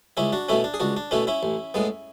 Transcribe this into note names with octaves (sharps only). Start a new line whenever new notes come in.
C#2 C#4 E4
D4 F#4
B2 A3 C#4 E4
D4
G#4
C#2 D4 F#4
D4
B2 A3 C#4 E4
C#4 E4
A1
A2 G#3 B3